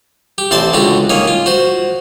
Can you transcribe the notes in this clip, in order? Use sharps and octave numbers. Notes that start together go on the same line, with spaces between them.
G4
A1 C3 C5 D5 A5
C#2 D3 F#4 G4
D#3 A#3 C#4
F4
F#4 C5